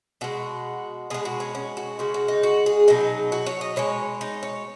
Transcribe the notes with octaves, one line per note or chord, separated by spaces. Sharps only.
B2 G#3 F#4
B2 G#3 G#4
F#4
C#4
C#4
F#4
C#3 G#3 F#4
F#4
D#4
F#4
G#4
B2 F#3 D#4
F#4
C#5
D#5
B2 G#3 C#5
D#4
C#5